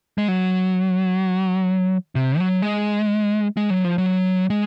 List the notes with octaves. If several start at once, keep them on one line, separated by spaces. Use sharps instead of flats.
G#3
F#3
C3
F#3
G#3
G#3
F#3
F3
F#3
G#3